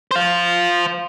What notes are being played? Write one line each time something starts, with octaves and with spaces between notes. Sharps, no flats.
C5 F5